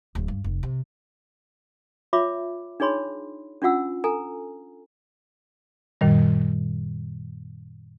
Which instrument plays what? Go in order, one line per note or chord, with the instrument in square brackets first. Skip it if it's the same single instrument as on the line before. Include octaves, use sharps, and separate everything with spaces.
[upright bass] D1
G2
F1
C3
[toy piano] F4 C#5 E5 B5 D6
D4 D#4 G#4 C#5 B5 C6
C#4 D4 F4 F#5 E6
A4 G#5 A#5
[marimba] F#2 A#2 D#3 G3